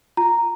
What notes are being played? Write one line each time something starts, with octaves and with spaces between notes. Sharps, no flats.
F4 A#5